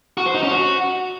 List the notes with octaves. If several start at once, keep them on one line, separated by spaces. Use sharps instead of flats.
F#4
C5
D#4
C#4
F#4